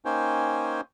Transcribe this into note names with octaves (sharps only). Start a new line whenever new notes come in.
A#3 C#4 D#4 C5 G5 G#5